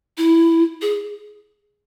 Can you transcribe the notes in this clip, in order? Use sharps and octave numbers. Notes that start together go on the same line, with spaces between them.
E4
G#4